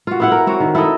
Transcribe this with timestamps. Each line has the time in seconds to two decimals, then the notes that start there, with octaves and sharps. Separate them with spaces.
0.07 F4 F#4
0.20 B3 E4 F#5
0.32 A#4
0.47 C4 F#4 C#5
0.60 D#3
0.75 E4 A4 A#4 D#5